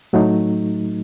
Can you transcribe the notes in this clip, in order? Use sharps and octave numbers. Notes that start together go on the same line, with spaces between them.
A2 F#3 A3 D#4